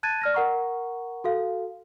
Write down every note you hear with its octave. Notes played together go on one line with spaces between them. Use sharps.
A5 F#6 G#6 A6 D#7
D5 F6 A#6
A#4 F#5 A#5 C#6
F#4 A4 F5